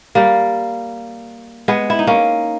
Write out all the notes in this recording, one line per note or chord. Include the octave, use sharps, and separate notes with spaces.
G3 A#3
G#3 B3
E4
D#4
A#3 C#4